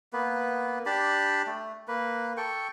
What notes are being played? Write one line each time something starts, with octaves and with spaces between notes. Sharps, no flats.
A#3 B3 B4
D4 G4 A5 B5
A3
A#3 B4
A4 G5 C#6